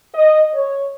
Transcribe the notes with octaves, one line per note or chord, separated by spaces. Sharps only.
D#5
C#5